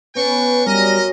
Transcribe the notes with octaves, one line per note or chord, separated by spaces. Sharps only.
B3 C#4 D4 B4 C#5 G5 C#6
F#2 G3 A#4 D#5